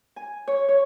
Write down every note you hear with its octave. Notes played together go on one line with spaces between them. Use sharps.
G#5
C#5
C#5